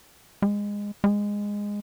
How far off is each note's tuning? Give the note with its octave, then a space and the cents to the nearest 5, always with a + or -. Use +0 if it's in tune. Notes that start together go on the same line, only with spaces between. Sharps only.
G#3 -20
G#3 -15